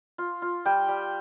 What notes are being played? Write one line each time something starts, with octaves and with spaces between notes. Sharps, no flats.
F4
F4
G3 G5
G3